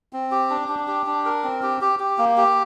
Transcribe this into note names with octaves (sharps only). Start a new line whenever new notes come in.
C4
G4
D4
D4
G4
D4
A#4
C4
G4
G4
G4
A#3
G4